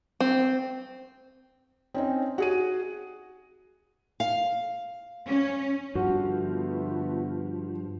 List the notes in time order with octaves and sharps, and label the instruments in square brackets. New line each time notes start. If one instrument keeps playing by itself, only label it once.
[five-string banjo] C4
[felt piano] C4 C#4 D#4
F#4 G#4 D#7
[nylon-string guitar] F5
[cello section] C#4
[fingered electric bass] G2 [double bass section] D3 A3 B3 [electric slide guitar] F3 [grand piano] F#4